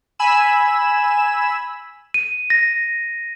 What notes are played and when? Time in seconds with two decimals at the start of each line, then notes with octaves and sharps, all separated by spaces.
0.19 G#5 B5 E6 E7
2.14 D#7
2.50 A#6